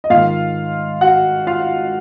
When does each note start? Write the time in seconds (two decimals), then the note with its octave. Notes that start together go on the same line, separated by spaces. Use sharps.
0.04 D#5
0.10 G#2 D#3 F4 F5
1.01 F#4 F#5
1.47 F4 F5